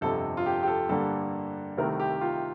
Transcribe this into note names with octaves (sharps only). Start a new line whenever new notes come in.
G1 F2 C3 A4
F4
G4
G4
A4
G2 D3 G3 A#3 A4
C2 C3 D#3 A3 A#4
G4
F4